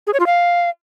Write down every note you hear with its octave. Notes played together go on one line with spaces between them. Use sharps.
G#4
C#5
F4
F5